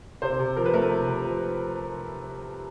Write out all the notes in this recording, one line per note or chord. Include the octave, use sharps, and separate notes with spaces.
C3 C5
C3
F3 A#4
B4
A3 A#4
C3
C3
F3